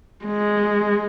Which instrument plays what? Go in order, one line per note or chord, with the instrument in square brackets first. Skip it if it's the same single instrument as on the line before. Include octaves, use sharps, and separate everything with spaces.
[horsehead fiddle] G#3